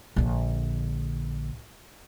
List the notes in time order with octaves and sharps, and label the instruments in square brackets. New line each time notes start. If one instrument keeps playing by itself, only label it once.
[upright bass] A#1 D3